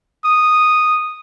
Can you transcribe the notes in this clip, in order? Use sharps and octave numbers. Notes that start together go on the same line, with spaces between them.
D#6